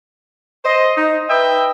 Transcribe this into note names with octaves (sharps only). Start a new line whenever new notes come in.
C5 D#5
D#4
B4 D#5 E5 G5